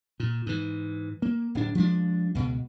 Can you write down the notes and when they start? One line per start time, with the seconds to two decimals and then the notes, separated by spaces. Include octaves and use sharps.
0.20 A#2
0.46 G#2 E3
1.22 A#3
1.55 D1 D4
1.75 F3 G#3 A#3 D4
2.35 C#2 B2